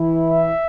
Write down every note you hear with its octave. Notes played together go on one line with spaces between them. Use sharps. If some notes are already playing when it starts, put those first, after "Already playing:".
Already playing: E3 E4
E5